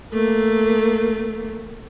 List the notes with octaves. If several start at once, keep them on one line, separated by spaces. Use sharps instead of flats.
A3 A#3